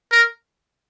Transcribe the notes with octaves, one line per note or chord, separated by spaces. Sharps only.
A#4